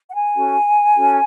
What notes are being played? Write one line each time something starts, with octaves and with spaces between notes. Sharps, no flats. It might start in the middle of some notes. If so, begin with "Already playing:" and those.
F#5
G#5
C#4 F#4 A4
C#4 F#4 A4